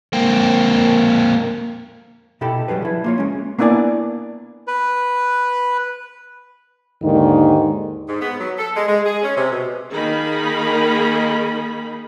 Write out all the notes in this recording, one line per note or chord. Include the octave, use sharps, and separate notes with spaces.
A#3 C4
B2 E4 G4 A4 B5
F#3 G3 G#4 B4
F3 E4
A#3 F4 C#5
G#3 C#4
A#3 B3 D4 E4 D5 G#5
B4
D#2 G#2 D3 D#3 D#4
G#2
B3
F#3
A4
G#3
G#3
G#4
C#4
C3
B2
D#3 A#3 D#4 G#4 A#4 B5